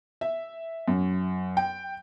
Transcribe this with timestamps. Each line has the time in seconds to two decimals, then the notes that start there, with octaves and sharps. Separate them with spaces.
0.21 E5
0.88 F#2
1.57 G5